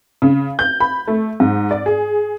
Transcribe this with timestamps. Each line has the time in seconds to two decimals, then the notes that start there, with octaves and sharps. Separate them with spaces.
0.22 C#3
0.59 G6
0.80 B5
1.08 A3
1.40 G#2
1.71 D5
1.86 G#4